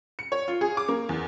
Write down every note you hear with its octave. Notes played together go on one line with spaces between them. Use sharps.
C#7
C#5
F4
G#4
D6
A#3
E2